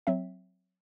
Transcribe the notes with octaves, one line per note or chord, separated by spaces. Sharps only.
F#3 C4 E5